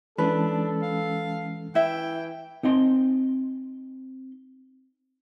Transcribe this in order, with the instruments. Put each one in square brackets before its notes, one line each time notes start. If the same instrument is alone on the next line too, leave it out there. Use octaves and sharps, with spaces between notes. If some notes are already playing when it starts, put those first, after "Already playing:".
[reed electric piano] E3 G#3 C#4 [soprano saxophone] D4 [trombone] A4 [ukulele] B4
[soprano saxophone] F5
[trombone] E3 [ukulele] E4 E5 [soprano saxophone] G5
[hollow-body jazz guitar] C4 D#4 D#5 C6